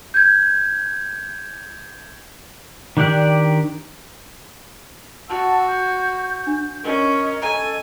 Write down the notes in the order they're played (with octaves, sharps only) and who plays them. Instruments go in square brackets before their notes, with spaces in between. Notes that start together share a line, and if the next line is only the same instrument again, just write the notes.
[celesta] G6 G#6
[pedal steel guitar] D#3 D4 G4 D5 F#6
[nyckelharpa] F#4 [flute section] F#5 A5 E6
[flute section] G6
[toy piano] D4
[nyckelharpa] C#4 [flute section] A#4 D#5
[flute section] A4 D#5 [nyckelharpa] G#5 [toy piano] A#5 C#6